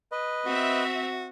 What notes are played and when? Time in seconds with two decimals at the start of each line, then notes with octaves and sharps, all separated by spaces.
0.12 B4 D#5
0.46 C4 F#4 E5